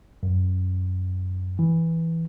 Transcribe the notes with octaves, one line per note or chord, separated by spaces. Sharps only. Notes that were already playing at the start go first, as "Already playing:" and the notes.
F#2
E3